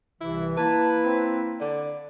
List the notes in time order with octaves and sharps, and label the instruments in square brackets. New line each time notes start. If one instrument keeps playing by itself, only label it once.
[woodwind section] C2 C3 E3 [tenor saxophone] E4
[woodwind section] A#3 E4 [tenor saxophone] B4 [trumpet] A5
[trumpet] C4
[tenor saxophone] D3 [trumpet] D5